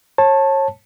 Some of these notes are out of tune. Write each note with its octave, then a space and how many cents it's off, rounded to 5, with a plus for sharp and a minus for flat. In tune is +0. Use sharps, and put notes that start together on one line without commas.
C#5 -30 A5 +0